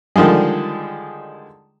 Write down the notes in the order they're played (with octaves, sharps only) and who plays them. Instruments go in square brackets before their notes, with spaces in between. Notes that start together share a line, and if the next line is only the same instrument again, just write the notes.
[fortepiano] D3 D#3 F3 G3 G#3